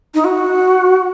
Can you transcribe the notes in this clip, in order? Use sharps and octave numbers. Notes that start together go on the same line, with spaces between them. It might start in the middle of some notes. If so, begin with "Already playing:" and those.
D#4
F#4